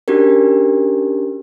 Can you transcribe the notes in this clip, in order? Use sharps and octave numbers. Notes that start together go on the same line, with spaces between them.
C#4 D4 F#4 G4 A#4